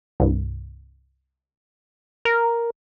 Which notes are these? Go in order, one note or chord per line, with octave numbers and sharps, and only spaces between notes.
C2 G2
A#4